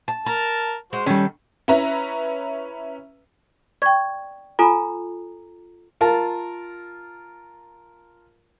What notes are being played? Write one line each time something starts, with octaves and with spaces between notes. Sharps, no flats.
A5
A#4 A5 A#5
G#3 F#4 C5
D#3 G3 C#4 A4
C#4 E4 B4 E5 A#5
D5 G5 C#6
F4 A4 G#5 A#5 B5
F4 A#4 A5